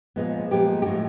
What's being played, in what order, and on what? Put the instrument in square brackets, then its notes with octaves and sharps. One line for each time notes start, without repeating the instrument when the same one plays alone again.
[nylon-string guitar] A#2 F3 G#3 B3
A#2 F3 G#3 B3 G4
G4
A2 F3 G#3 F#4